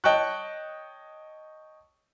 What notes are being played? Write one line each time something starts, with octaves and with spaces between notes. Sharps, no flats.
C#5 D#5 G5 A5 C#6 F#6